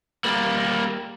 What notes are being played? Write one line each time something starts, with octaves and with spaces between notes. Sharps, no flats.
G3 A#3